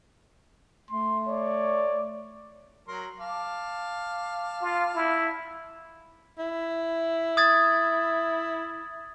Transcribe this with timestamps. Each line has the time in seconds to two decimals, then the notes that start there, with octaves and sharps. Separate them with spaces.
0.91 A3 C6
1.28 C#5 D5
2.88 F#3 A#4 C6
3.20 F5 A5 D6
4.62 F4
4.95 E4
6.38 E4
7.37 D#6 G#6 A6